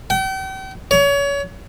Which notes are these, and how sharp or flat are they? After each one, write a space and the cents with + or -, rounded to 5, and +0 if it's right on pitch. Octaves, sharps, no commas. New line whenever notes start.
G5 -40
C#5 +30